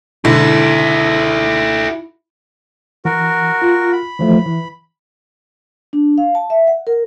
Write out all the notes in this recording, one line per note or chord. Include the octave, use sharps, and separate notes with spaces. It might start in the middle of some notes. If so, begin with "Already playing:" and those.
G#2 B2 D3 E4 F#4 A4
E3 F#4 A#4
F4
B5
E3 F3 A3
E3
D4
F5
A5
E5
F#5
A#4